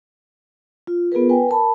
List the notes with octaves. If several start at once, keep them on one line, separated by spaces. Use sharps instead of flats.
F4
B3 F4 G#4 A#4 B4
B4 G5 G#5
A#4 A5 B5